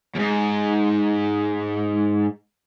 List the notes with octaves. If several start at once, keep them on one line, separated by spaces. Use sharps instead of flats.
E2 G#2